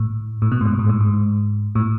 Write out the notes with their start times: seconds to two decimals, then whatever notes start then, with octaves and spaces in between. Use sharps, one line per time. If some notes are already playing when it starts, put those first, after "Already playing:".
Already playing: A2
0.42 A2
0.52 B2
0.61 G#2
0.66 A2
0.79 G#2
0.89 A2
1.00 G#2
1.75 A2